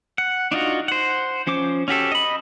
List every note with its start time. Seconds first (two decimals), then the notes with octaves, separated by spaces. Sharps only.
0.18 F#5
0.51 D4 D#4 F4 F#4
0.88 C5 F#5
1.47 F3 C#4 C5 D6
1.88 C#4 F#4 G4 A4
2.12 D#5 B5